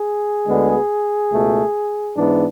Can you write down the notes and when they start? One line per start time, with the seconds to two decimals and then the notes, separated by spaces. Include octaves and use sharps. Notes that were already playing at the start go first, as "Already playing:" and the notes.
Already playing: G#4
0.46 D2 D3 G#3 B3
1.31 C#2 B2 A3
2.15 G#2 E3 B3 D4